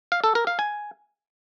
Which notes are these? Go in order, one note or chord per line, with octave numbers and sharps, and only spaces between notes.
F5
A4
A#4
F5
G#5